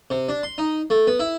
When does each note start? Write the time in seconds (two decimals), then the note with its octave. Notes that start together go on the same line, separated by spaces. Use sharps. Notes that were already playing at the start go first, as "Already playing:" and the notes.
0.10 C3
0.29 D4
0.43 C6
0.58 D#4
0.90 A3
1.07 B3
1.19 E4